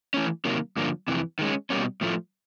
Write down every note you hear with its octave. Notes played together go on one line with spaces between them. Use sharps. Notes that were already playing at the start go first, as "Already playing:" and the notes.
E3 A3 C#4
C3 D#3 F#3 A#3
G2 D3 F3 A#3
F2 C3 E3
D#3 G#3 C#4
B2 G3 A#3 C#4
A2 F3 A3